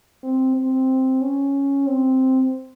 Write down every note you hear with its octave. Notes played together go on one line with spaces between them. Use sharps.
C4
C4
C#4
C4